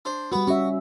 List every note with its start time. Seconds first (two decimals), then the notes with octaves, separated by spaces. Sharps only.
0.05 D4 C5
0.32 G3 B3 F#4 B4
0.47 C#4 F#4 E5